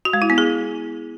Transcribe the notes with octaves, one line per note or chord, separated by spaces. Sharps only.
F#4
G#3
E4
B3
G#4